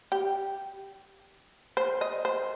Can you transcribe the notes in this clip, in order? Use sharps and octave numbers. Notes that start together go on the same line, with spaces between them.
G4
C5
D#5
C5